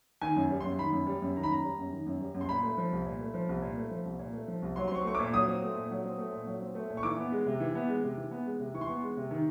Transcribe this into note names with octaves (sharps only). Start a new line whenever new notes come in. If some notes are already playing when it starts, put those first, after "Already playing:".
D#3 G#5
F#2
G3
F#2 C6
D#3 B5
F#2
G3
F#2
D#3 A#5
B5
F#2 A#5
G3
F#2
D#3
F#2
G3
F#2
C6
A#2 B5
A3
F3
C2
A#2
A3
F3
C2
A#2
A3
F3
C2
A#2
A3
F3
C2
F#3 C6
C6
C4 C#6
A3 C#6
A#2 D6
F#3 D#6
C4
A3
A#2
F#3
C4
A3
A#2
F#3
C4
A3
A#2
C#6
E3 D6
B3
G#3
C3
E3
B3
G#3
C3
E3
B3
G#3
C3
E3 C#6
C6
B3 C#6
G#3
C3
D#3